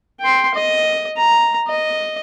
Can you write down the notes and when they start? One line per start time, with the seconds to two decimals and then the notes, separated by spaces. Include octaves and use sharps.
0.21 G5 C6
0.55 D#5
1.17 A#5
1.68 D#5